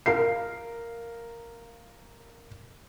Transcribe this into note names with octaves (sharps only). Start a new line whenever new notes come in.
A#4 F5 C7